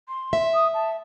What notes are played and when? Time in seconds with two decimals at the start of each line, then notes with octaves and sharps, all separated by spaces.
0.08 C6
0.33 E5
0.54 D#6
0.74 A5